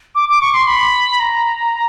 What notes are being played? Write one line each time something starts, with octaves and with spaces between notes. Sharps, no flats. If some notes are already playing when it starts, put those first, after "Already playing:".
D6
D6
C#6
C6
B5
A#5